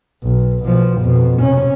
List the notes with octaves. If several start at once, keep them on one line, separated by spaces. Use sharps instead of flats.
B1
B2 F3
F2 B2
C3 C#4